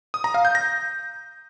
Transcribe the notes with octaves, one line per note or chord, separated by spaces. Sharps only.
D#6
A#5
F5
G6
A#6